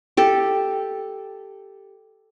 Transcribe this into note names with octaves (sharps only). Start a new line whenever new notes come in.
G4 A4